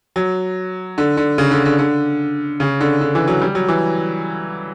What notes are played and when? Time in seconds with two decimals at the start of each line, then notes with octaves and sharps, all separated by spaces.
0.16 F#3
0.98 D3
1.17 D3
1.38 C#3
1.51 D3
1.66 D3
1.79 D3
2.60 C#3
2.80 D3
3.01 D3
3.15 E3
3.28 F#3
3.42 G3
3.55 F#3
3.68 E3